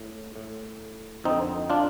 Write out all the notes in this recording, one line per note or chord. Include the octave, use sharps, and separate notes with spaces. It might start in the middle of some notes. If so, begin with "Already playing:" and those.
Already playing: A2
A2
F2 D3 C4 D#4
D4 F4